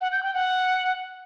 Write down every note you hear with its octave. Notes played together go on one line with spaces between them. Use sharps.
F#5
G6
G5
F#5